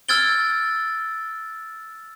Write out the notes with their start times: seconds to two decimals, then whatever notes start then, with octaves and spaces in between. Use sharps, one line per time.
0.08 E6 F6 G#6 A6 D7 G7